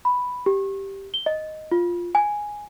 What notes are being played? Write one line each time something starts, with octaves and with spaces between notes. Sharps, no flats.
B5
G4
G7
D#5
F4
G#5